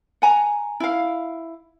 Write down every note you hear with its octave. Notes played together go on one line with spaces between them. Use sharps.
F#5 G#5 A#5
E4 F5